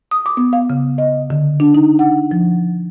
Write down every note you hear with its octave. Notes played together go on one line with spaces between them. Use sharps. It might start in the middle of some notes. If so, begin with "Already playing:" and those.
D#6
D6
B3
F5
C#3
D#5
D3
D4
D#4
F#5
F3